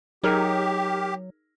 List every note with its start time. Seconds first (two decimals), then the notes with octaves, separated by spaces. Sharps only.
0.24 F#3 D#4 G4 G#4 A#4